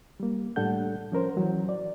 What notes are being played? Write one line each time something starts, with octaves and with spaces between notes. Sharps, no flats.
G3 A#3
A2 G3 D4 A4 F#5 G6
F3 C#4 A#4 C5
E3 F#3
D5